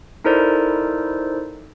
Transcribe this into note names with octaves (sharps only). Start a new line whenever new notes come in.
D#4 E4 A4 A#4 C5 D5